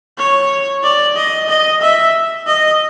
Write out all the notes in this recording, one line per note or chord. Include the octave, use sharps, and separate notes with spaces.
C#5
D5
D#5
D#5
E5
D#5